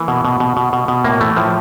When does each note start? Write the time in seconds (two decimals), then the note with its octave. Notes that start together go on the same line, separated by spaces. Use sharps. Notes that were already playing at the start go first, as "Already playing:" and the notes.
Already playing: E3 A#3
0.08 B2
0.25 B2
0.40 B2
0.57 B2
0.73 B2
0.88 B2
1.04 A2 A#3
1.21 E3 A3
1.36 A2 F3